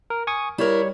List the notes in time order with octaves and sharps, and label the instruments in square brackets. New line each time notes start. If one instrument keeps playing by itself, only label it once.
[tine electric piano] A#4
G#5 C#6 D#6
[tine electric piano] G3 C#5 [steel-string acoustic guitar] E4 A#4